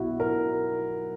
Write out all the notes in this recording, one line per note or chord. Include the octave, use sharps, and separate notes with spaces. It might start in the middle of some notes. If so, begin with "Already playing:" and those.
Already playing: B1 B2 F#3 E4 F#4
A#4